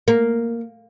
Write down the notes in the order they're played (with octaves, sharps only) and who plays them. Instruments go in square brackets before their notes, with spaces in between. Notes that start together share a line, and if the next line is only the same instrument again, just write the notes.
[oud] A#3